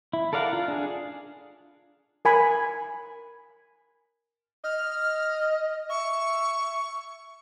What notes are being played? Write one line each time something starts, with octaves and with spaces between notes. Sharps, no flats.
E4
A4 A#4 D5 F5 F#5
F4
D4 G#4
A#4 G#5 B5
D#5 F6
E5 C#6